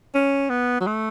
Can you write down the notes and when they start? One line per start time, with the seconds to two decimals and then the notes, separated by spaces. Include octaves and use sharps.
0.15 C#4
0.50 B3
0.81 F#3
0.87 A3